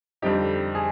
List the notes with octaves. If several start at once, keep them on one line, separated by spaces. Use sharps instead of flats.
F2 D3 G3 C4 D#4 G4
G#4